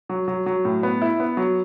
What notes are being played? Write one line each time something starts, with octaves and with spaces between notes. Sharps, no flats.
F#3
F#3
F#3
A2
B3
E4
B3
F#3